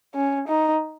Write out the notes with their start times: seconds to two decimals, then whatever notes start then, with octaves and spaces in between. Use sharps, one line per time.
0.15 C#4
0.48 D#4